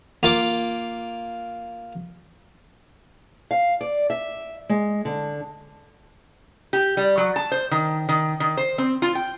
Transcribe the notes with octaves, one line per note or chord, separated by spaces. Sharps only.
A#3 F4 D6
F5
D5
E5
G#3
D3
G4
G3
F#3
A5
C5
D#3
D#3
D#3
C5
C4
F4
G5